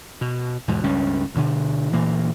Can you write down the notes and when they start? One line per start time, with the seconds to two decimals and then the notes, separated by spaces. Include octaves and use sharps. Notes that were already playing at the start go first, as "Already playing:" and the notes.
0.21 B2
0.68 E2 G#2 B2
0.84 C#2 G2 C#4
1.35 D2 B2 D3
1.93 D2 A#2 E3 A#3